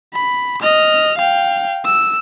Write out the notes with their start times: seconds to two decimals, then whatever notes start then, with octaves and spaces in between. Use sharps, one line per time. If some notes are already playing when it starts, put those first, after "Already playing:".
0.13 B5
0.62 D#5 F6
1.18 F5 G5
1.85 E6